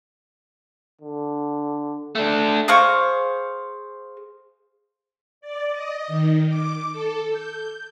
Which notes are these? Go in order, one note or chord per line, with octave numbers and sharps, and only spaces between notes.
D3
A3 D4
G#4 C5 F5 C#6
D5
D#5
D#3
D6
A4
G6